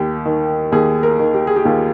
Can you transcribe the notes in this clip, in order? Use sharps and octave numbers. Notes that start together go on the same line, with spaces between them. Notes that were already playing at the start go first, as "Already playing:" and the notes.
Already playing: D#2 G4
D#3
D#2 G#4
A#4
D#3
G4
G#4
G4
D#2 F4